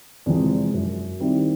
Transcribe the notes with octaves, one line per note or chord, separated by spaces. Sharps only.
E2 C3 F3 G#3
F#2
D#3 G3 C4 E4